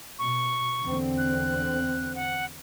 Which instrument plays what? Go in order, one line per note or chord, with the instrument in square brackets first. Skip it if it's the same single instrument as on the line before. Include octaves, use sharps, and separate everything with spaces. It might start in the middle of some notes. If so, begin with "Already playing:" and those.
[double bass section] B2 [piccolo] C#6
[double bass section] E2 D3 C4
[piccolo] F#6
F#5